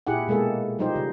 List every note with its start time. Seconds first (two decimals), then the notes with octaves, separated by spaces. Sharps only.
0.07 A#2 E4 G4 G#4 F#5
0.28 B2 G#3 A#3 G#4 A4
0.79 F3 G3 D#4 G4 C5
0.95 C#3